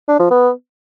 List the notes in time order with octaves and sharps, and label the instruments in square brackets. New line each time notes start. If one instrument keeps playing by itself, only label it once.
[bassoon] D4
F3
B3